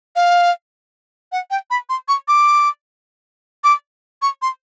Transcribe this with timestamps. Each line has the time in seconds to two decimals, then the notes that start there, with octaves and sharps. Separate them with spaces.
0.16 F5
1.32 F#5
1.51 G5
1.70 B5
1.89 C6
2.08 C#6
2.28 D6
3.64 D6
4.22 C#6
4.42 C6